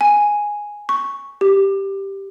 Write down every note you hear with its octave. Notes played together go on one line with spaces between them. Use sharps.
G#5
C#6
G4